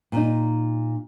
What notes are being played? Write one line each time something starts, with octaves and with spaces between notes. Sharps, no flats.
A#2 D#4